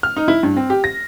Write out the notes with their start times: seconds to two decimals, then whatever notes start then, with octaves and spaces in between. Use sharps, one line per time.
0.03 F6
0.16 D#4
0.28 E4
0.43 G2
0.56 C4
0.70 G4
0.84 A#6